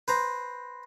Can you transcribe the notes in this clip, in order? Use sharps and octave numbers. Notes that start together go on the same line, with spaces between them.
B4 C5 A#5